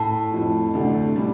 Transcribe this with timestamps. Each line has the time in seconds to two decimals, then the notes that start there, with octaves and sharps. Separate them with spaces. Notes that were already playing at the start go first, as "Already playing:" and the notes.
Already playing: A2
0.32 F1 F2 F3
0.74 D2 C3 A3 D4
1.16 A2 G3 D4